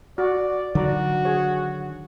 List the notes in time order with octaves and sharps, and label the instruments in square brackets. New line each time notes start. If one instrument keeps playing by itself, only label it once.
[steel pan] F#4 [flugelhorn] D5
[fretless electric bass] D3 D#3 F#3 [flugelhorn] F#4 [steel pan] D5 A#5
[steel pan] G#4 C#5